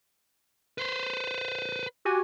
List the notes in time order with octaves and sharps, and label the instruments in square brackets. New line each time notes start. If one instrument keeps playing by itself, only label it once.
[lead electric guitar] B4 C5
[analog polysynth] F#4 G4 G#5